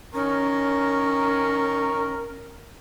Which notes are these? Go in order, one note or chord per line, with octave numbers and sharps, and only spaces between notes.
D#3 C#4 A#4 A#5 C#6